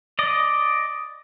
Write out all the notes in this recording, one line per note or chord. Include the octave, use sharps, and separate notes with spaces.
D5 D#5